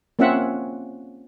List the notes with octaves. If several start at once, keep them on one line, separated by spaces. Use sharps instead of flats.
A#3 C4 C#4 F4 E5 F#5